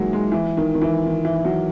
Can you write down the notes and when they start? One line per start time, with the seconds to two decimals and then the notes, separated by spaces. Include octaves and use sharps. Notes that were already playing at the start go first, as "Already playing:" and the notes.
Already playing: D#3 E3 F#3 G#3 A#3
0.13 G#3
0.32 E3
0.57 D#3
0.74 D#3
0.82 E3
1.06 D#3
1.25 E3
1.45 F#3